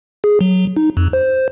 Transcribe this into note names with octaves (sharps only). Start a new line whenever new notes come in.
G#4
F#3
D#4
F2
C5